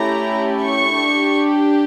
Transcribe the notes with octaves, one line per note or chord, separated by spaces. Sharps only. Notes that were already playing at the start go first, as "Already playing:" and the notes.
Already playing: A3 C#4 E4 G4 A#5
C#6
D4 G4